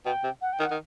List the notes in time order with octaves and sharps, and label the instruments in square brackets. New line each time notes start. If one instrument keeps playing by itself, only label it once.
[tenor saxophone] B2 [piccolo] G5
[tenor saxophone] C3
[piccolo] F#5
G5
[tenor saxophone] D#3
[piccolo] F#5
[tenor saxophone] D#3